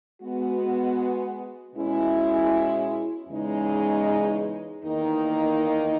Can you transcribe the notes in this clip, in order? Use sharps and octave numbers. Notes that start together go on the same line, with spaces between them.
G#3 B3 F#4
B2 G#3 C#4 E4
E2 C#3 G#3 D#4
E2 D#3 A#3 D#4